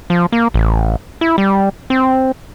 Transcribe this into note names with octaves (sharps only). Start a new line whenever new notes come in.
F3
A#3
A1
E4
G3
C4